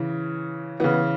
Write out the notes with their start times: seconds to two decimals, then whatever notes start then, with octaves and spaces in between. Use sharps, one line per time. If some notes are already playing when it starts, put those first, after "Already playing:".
Already playing: C#3 E3
0.80 C#3 E3 B3